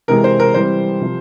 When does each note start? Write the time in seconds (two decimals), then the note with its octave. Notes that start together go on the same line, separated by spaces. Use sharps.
0.08 C3 E3 G#3 A#4
0.24 C5
0.40 A#4
0.54 E3 G3 C4 C5
1.01 C3 F3